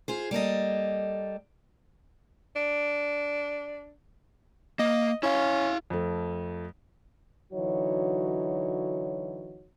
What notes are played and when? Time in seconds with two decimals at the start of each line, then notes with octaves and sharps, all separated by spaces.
0.08 F4 G#4 C5
0.31 G3 A#3 A4 D#5
2.56 D4
4.79 A#3 D#5
5.23 C#4 E4 F5
5.90 F2 A3
7.53 D3 E3 F#3 D#4 F#4 C#5